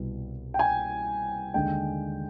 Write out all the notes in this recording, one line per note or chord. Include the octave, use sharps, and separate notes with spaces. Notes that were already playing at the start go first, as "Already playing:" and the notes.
Already playing: C2 B2 G3
G5
G#5
D#2 D3 G#3 G5